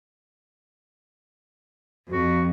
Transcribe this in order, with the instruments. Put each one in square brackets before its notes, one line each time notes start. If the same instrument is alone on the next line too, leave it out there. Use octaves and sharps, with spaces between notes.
[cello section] F2 [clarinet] F#4